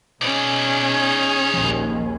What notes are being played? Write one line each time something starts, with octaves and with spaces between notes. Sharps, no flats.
B2 C#4 D#4 G#4 D5
A#1 D#2 F3